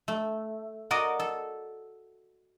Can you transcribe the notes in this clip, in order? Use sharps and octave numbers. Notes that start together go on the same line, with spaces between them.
A3
F#4 A#4 D5 D#5
A4